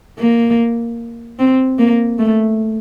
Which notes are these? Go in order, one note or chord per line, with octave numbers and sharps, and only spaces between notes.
A#3
C4
A#3
A3